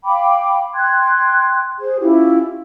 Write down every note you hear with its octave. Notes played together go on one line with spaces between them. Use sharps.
F5 G5 B5 D6
G5 C6 F#6 G#6
G#4 C5
C#4 E4 F4 G4